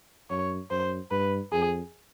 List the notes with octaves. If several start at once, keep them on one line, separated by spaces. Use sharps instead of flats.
F#2 C#5
F#2 C5
G2 B4
F2 G#4